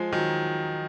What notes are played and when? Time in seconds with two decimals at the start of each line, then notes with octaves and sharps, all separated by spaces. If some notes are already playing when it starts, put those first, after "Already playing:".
Already playing: F3 G#3
0.12 D#3 F#3